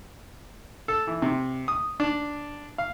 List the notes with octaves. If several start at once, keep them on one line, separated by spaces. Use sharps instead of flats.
A4
E3
C3
D#6
D4
F5